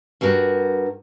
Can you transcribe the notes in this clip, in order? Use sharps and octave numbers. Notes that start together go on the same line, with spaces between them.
G2 G3 F#4 A#4